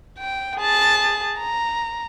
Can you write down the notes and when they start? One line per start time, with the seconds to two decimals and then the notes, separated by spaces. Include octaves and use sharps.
0.19 G5
0.59 G#4 A5
1.38 A#5